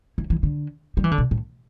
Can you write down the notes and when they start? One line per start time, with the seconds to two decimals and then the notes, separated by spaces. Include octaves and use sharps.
0.18 E3
0.30 E3
0.43 D3
0.97 G3
1.04 E3
1.11 D3
1.18 B2
1.31 A2